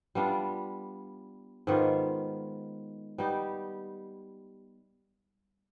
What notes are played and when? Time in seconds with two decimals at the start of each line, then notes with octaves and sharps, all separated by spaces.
0.15 G3 B3 D4 F4
1.67 G#2 D#3 B3 F4
3.18 G3 B3 D#4 G4